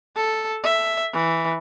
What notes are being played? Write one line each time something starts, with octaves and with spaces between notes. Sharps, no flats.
A4
E5
E3